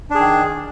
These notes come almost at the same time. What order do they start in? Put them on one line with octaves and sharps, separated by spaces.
D4 G#4 D#3